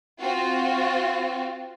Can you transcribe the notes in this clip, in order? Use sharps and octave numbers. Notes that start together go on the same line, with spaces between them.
C4 F4 F#4